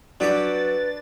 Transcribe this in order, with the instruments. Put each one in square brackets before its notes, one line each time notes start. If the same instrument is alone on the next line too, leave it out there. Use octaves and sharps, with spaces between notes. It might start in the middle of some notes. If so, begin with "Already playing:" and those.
[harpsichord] F#3 G4 D6 [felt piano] D4 [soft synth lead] B4 [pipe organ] A6